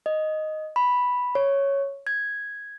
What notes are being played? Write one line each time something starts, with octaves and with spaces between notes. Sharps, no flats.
D#5
B5
C#5
G#6